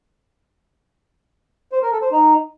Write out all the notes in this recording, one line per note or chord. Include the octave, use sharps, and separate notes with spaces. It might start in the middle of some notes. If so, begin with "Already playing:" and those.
C5
A#4
A4
C5
D#4